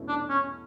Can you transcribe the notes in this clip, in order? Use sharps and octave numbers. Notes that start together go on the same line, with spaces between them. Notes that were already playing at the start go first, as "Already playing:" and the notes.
Already playing: E2 B2 A3 C#4 E4
D4
C#4